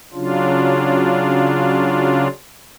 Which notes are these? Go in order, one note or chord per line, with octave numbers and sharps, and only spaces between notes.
C#3 F#3 D4 F4